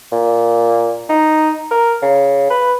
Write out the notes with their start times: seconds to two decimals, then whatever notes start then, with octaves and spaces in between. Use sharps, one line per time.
0.12 A#2
1.09 D#4
1.71 A#4
2.02 C#3
2.50 B4